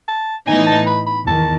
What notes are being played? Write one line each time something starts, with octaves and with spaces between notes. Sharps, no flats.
A5
A2 E3 B3 D#4 G#5
A5
B5
B5
E2 D#3 A5